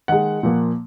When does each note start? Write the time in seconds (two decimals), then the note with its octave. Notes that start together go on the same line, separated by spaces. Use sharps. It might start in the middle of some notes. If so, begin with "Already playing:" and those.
0.08 D#3 G#3 F#5
0.43 A#2 F3 A#3